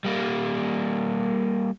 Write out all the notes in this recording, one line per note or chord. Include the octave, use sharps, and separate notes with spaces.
G3 A#3